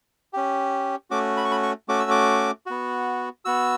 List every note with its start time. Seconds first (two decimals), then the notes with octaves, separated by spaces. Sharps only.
0.33 C#4 G4
1.10 A3 C#4 F#4 D6
1.37 B5
1.44 C#6
1.51 B5
1.63 C#6
1.88 A3 C#4 F#4 D6
2.00 E6
2.11 D6
2.66 B3 F#4
3.45 B3 F#4 E6